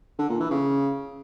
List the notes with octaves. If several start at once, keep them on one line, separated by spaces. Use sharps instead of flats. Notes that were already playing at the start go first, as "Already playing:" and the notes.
D3
A#2
E3
C#3